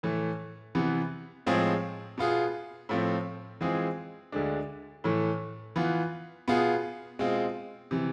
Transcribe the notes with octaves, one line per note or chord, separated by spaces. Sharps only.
A2 E3 A3
C3 E3 B3
A2 F3 G#3 C4 G#4
B2 B3 F4 G#4
A2 F3 A3 C4
E3 G#3 C4 F4 G#4
D2 D3 G#3 D4
A2 E3 A3
E3 B3 F4
B2 B3 F4 G#4
B2 G#3 C4 F4
C3 E3